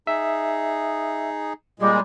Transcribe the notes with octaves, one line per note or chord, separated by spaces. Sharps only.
D#4 G#4 E5
A#2 G3 G#3